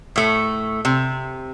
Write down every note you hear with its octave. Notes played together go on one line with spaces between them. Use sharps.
A2 A3
C3